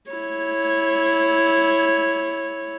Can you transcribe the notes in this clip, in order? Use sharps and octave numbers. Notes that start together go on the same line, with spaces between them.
E4 C#5